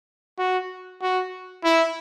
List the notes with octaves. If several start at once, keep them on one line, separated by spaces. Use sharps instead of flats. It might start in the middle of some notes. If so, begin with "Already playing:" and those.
F#4
F#4
E4